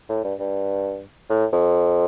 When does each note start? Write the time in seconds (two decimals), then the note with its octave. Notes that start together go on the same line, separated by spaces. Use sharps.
0.09 A2
0.24 G2
0.39 G2
1.30 A2
1.52 F2